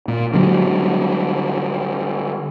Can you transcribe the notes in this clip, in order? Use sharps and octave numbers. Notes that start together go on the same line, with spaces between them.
A#2
D3 F#3 G3